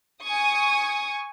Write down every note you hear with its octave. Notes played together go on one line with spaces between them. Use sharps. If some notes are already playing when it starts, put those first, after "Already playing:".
G#5 C#6 D#6